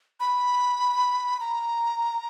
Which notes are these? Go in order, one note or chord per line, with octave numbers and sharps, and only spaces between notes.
B5
A#5